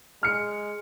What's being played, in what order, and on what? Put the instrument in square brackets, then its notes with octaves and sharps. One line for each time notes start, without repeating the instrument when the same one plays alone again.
[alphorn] G#3 [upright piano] F6 C#7